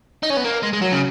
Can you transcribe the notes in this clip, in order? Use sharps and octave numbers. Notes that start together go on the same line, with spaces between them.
D#4
C#4
B3
A#3
G#3
G#3
F#3
C#3